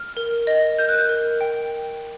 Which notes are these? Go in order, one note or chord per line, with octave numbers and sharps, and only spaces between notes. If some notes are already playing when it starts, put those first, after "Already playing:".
Already playing: F6
A#4
D#5
A#4 G6
F#6
G6
A#4
G5